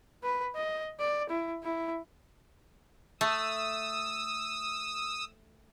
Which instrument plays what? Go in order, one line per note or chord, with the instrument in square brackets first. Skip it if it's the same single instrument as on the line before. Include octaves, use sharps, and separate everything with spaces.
[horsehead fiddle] B4
D#5
D5
E4
E4
[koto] A3 [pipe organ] D#6 E6